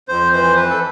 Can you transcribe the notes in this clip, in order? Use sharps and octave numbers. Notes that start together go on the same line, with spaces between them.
F2 C5
E3 C5
E3 B4
A4